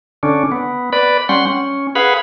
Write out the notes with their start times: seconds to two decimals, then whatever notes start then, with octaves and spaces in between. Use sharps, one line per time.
0.23 D3 C#4 D4
0.52 B3
0.93 B4 D5 B5
1.29 G3 C#4 F#5 C6
1.47 C#4
1.95 G#4 B4 F5 F#5 B5